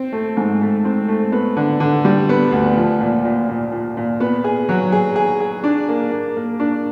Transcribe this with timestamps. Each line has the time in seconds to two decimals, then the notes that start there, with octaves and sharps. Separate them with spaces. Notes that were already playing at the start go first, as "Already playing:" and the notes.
Already playing: C4
0.12 A3
0.37 G#2
0.62 A3
0.85 C4
1.08 A3
1.32 B3
1.57 D3
1.80 D3
2.05 G3
2.29 B3
2.52 D2
2.77 F3
3.00 A#2
3.25 A#2
3.49 A#2
3.72 A#2
3.97 A#2
4.20 B3
4.44 G#4
4.69 F#3
4.92 G#4
5.16 G#4
5.40 G#4
5.64 D4
5.89 A#3
6.12 A#3
6.37 A#3
6.60 D4